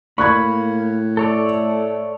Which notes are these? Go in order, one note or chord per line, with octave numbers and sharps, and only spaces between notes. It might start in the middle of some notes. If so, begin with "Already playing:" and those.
A2 A#3 B5 C#6 F#6 G#6
A3 A4 C#5 D5